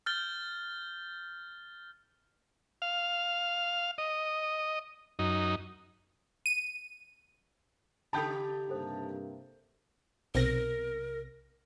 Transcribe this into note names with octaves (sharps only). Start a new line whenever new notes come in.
F6 G6 A6 G7
F5
D#5
F#2 D#4
D#7
C#3 D#4 G4 A4 G5 A5 B5 G6
G2 C3 A#3 A4 C5
B1 C3 A#4 A#6